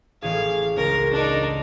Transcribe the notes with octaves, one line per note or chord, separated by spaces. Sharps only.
A1 G#4 F5
C#2 A#4
D4 D#4